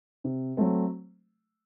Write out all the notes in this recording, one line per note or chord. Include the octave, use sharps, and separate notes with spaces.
C3
F#3 A3 C4